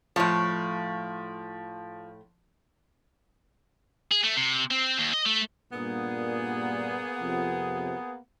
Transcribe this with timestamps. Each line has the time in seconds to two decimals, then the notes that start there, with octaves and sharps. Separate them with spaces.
0.16 A2 F3 C#5
4.11 G#4
4.24 A3
4.36 C3
4.71 C4
4.99 D#2
5.14 D#5
5.26 A3
5.72 G2 A#2 A#3 B3 G#4
7.20 F2 C3